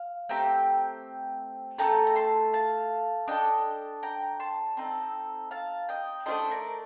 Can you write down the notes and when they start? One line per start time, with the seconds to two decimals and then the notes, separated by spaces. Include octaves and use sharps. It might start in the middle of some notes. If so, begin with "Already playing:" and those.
Already playing: F5
0.29 A3 C4 G4 G5 A#5
1.78 A3 D#4 A4 G5 A#5
2.07 A#5
2.16 A5 C6
2.53 F5 A5
3.28 D4 A4 D#5 G5
4.03 G5 A#5
4.40 A5 C6
4.77 C4 D#4 A4
5.51 F5 A5
5.89 D#5 G5
6.26 A3 D4 F4 A4 C5 D#5
6.51 A#4 D5